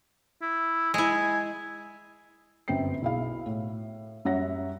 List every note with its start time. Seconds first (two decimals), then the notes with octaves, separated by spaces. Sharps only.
0.42 E4
0.94 G#3 E4 G#5
2.68 G1 F#2 C4 G5 C7
3.02 B1 B2 E4 G#4 F5
3.46 A2
4.25 F#2 G3 C#5 E5 F#5 A#6